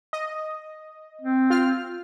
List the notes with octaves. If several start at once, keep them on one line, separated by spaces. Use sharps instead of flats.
D#5
C4
F4 F6